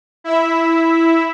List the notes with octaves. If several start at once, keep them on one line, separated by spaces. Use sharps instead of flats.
E4 E5